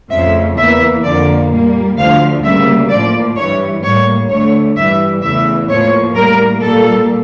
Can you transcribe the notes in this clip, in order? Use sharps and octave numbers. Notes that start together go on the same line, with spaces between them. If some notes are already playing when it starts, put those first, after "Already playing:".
F2 C#3 F3 A3 E5
E2 E3 A#3 E5
F2 D3 F3 A#3 D5
A#2 G3 A#3
D2 D3 F3 A3 F5
D2 C#3 G3 A#3 E5
A2 F3 A#3 D5
G2 E3 G3 C#5
A2 G3 A#3 C#5
D2 D3 A3 C#5
G2 E3 G3 E5
E2 C#3 E3 A3 E5
A2 F3 A#3 C#5
A2 G3 A#3 A#4
A#2 G3 A#3 A4